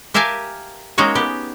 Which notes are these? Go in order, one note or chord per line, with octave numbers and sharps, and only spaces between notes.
G4 A#4 E5 F5 G#5 A5
G#3 A#3 C#4 D#4 F#4 C#5
B3 G4